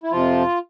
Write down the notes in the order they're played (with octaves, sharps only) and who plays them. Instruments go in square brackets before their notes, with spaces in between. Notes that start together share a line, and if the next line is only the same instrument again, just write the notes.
[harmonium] E4
F2 C3 F3 F4